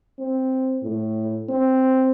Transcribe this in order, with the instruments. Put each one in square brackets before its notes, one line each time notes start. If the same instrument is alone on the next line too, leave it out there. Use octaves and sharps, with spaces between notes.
[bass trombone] C4
A2
C4